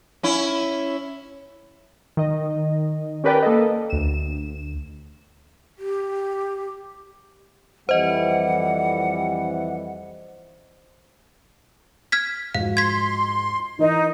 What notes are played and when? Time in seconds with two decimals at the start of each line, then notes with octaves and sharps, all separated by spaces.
0.23 C#4 E4
2.17 D#3 D#5
3.24 C#4 G4 A#4 B4 D5 G5
3.42 A#3 A4 D#5
3.90 D2 E7
5.79 G4
7.89 F2 E3 G3 C5 D#5 F#5
12.12 F6 G#6 B6
12.55 G#2 F3 F#4 F5
12.77 C6 G#6 B6
13.79 E3 D#4 A#4 D#5